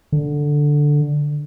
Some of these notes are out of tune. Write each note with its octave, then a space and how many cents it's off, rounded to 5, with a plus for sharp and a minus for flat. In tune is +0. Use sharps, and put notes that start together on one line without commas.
D3 +0